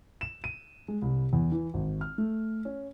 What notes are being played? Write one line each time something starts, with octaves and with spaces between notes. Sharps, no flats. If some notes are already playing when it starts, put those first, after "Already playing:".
E7
D#7
G#3
C2
E2
E3
G#1
F6
A3
C#4